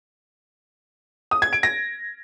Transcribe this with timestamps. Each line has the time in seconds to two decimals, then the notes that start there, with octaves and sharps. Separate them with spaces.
1.31 D#6
1.42 G#6
1.53 D7
1.63 A#6